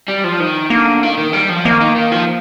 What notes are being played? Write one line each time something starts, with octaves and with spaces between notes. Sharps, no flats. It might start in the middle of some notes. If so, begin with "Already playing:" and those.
G3
F3
D#3
D3 A#3
D#3
D#3
G3
F3
D#3 A#3
D#3
D#3
F3